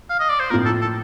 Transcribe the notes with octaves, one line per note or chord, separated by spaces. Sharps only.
F5
D#5
D5
C5
A2 F3 A#3 F4 A#4
A4
A4